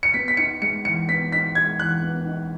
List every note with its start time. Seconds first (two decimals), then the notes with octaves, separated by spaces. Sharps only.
0.03 C#7
0.14 B3 B6
0.28 B6
0.37 D#4 C#7
0.62 G#3 C#7
0.85 E3 C#7
1.09 B3 B6
1.32 D#4 B6
1.55 G#3 G#6
1.79 E3 F#6
2.03 B3
2.26 D#4